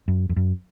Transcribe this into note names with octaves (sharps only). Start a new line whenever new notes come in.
F#2
F2
F#2